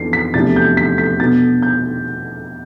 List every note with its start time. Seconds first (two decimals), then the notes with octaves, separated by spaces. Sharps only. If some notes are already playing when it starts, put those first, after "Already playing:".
Already playing: F2 E3 B3 D4 C7
0.13 B6
0.34 E2 C3 F3 A3 D4 A6
0.56 G6
0.77 B6
0.98 B6
1.19 B2 B3 D4 A6
1.62 G6